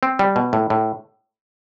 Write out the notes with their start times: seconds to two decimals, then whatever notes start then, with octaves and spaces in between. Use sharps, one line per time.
0.03 C4
0.19 G3
0.36 B2
0.53 A2
0.70 A2